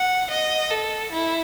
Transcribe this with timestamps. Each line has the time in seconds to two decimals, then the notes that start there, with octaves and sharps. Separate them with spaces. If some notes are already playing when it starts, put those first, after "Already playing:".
Already playing: F#5
0.30 D#5
0.70 A4
1.12 E4